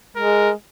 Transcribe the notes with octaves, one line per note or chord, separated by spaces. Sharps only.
G#3 A#4